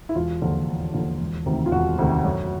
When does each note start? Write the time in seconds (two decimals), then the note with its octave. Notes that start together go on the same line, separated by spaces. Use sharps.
0.09 E4
0.15 E1 F4
0.42 D#2 D3 F3
0.68 E1
0.94 D#2 D3 F3
1.20 E1
1.46 D2 C3 D#3
1.66 F4
1.72 E1 F#4
1.99 D2 C3 D#3
2.24 F#2